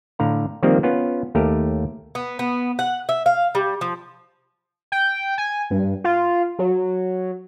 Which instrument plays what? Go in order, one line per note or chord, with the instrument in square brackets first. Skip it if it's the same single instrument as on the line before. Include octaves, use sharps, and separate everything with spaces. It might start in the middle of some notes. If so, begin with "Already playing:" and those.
[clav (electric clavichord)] A2 D3 F5 A#5
D#3 F3 G3 A#3 C4
B3 C#4 F4
D#2 A3 G4 A#4
[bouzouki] B3
B3
F#5
E5
F5
G3
F3
[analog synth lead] G5
G#5
G2
F4
F#3